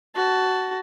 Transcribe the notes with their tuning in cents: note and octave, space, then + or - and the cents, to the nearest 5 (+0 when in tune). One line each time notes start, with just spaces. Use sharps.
F#4 +15 A5 +0